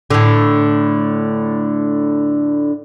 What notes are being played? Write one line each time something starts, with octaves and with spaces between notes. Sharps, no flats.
A2 D3